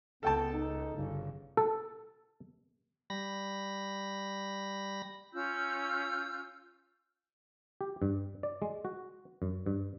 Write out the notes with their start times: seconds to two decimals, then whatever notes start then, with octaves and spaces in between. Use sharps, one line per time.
0.23 C#2 B3 A4 G5 A5
0.52 D#4
0.97 G1 C#3
1.57 A4
3.10 G3 B5 A#6
5.33 C#4 F4 E6 G6
7.81 G4
8.02 G2
8.43 D5
8.62 G#3
8.85 F#4
9.42 F#2
9.66 G2